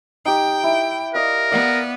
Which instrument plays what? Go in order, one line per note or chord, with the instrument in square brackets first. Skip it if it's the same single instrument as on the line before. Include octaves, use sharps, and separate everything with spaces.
[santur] D#4 G4 [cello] G5
[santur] E4
[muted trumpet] A#4 [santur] D5 D#5 F5
[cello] B3 [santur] D5 F5 F#5